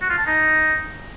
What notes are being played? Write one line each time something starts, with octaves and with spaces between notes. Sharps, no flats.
F#4
F4
A5
D#4